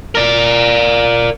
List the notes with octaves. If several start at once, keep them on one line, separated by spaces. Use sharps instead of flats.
A#4 D5